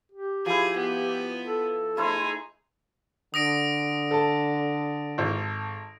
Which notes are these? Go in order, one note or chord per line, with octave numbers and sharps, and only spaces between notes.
G4
F3 E4 G#4
B3
A4
A3 D#4 E4 G#4 C5
D3 D#6 A#6 D7
A4 A5
G#1